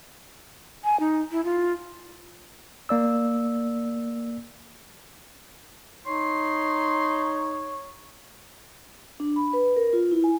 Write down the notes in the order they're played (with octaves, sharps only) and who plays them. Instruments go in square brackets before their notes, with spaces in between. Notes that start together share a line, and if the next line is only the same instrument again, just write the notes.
[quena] G#5
D#4
E4
F4
[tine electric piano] A#3 D5 E6
[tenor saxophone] D#4 [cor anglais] C#5 [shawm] C6
[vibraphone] D4
B5
B4
A#4
F4
E4
G#5